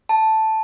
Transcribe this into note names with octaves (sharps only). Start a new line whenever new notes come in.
A5